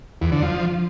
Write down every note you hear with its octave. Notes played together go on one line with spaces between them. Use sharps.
E2
D3
F3